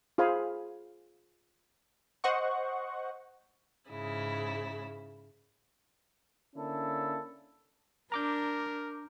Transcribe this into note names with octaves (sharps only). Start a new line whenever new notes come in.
F4 G#4 C5 F5 G#5 B5
C5 D#5 F#5 C#6
G#2 C#3 E4
D3 A#3 C#4 D4 E4 A4
D4 A#4 A#5 D6 G6